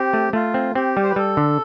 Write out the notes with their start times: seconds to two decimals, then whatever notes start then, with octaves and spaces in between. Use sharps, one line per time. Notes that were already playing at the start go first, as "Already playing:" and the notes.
Already playing: C4 G4
0.13 A3
0.33 A3 F4
0.54 C4
0.75 C4 G4
0.97 G3
1.03 C5
1.10 B4
1.16 G3 A4
1.37 D3